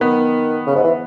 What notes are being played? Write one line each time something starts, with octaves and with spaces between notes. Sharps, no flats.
D#3 B3
C#3
G#2
E3